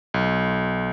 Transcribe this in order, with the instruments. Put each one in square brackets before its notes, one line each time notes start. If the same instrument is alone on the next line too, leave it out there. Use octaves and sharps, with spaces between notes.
[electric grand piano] B1